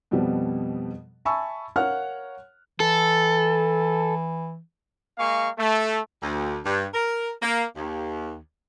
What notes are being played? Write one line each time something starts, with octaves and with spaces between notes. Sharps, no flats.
F2 B2 F3 G3 B3
E5 G#5 A5 B5 C#6 E6
A#4 C#5 F5 F#5 F6 F#6
E3 A4
G#3 A#3 F5 G#5 C#6
A3
D2
G2
A#4
A#3
D#2